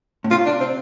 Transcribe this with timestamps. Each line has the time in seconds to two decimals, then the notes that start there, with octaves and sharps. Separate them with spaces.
0.24 A2
0.31 C3 F4
0.46 D4
0.61 C4